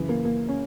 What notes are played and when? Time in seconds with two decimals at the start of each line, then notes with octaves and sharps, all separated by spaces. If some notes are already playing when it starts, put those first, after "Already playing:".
Already playing: F#2 C#3 E3
0.09 A#3
0.25 A#3
0.48 C#4